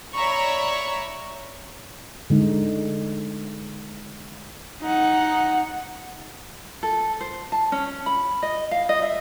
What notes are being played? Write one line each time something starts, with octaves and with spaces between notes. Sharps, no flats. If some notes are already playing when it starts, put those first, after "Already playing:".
C#5 D5 E5 A#5 B5 C#6
D3 G#3 D#4
D#4 F#5
A4
C5
A5
C#4
B5
D#5
F5
D#5
E5